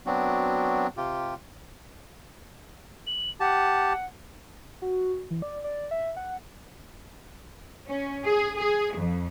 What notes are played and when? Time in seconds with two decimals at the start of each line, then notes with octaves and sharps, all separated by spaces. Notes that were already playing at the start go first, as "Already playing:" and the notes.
0.06 F#3 B3 C4 D4 F#4
0.97 C3 F4 G4
3.07 F#7
3.40 G4 F#5 A5
4.82 F#4
5.31 E3
5.42 D5
5.64 D5
5.91 E5
6.16 F#5
7.87 C#4
8.26 G#4
8.58 G#4
8.95 F2